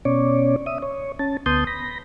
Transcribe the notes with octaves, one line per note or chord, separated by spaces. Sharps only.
B2 C#4 C#5 D5
E5 D#6
C#5
C#4 A5
D2 B3 A5 C6 D#6 G6
B5 A#6